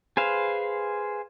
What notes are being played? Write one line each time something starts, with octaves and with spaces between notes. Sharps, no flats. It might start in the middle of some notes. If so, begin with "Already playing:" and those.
G#4 B4 C5 F5